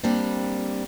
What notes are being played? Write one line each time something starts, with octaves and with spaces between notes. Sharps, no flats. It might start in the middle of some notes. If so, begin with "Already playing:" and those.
G3 A#3 C4 D4